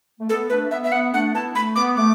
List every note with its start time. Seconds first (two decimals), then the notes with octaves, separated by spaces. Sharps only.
0.20 A3
0.29 B3 A4
0.50 A3 D4 B4
0.62 A3
0.71 B3 E5
0.84 E5
0.92 B3 F#5
1.13 A3 D4 F#5
1.34 B3 E4 A5
1.55 A3 B5
1.76 B3 D6
1.97 A3 D6